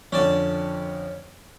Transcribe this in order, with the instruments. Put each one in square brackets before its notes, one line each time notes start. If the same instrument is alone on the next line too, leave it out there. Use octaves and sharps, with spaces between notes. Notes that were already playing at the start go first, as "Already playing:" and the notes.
[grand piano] F2 D3 [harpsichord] C#4 D5 A5